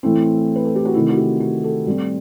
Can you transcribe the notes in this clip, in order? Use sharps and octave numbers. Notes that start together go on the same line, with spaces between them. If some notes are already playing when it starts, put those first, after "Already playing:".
A2 E3 A3 C4 E4
B4
A4
G4
F#4
C3 D#3 A3 C4 E4
F#4
G4
F#4
A4
A2 G3 C4